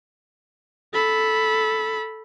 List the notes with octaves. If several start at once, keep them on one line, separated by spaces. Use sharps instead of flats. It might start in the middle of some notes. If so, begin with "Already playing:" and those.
A4 B5